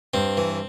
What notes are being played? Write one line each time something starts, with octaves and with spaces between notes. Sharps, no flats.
G2 C4
E3